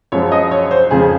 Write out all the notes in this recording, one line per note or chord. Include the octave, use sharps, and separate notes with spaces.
F#2 F3 G#3 C#5
D#5
C#5
C5
F2 C#3 F3 G#3 G#4